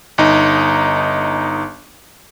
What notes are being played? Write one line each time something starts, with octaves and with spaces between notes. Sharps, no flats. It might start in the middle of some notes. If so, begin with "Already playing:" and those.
G1 D#4